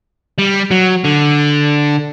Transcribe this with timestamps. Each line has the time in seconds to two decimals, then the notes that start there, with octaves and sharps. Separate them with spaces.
0.39 G3
0.71 F#3
1.04 D3